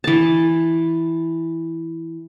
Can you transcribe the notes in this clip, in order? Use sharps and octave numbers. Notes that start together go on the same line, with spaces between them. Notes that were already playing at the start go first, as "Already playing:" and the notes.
E3 A5